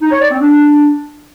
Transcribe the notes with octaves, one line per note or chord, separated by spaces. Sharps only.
D#4
C#5
D5
C4
D4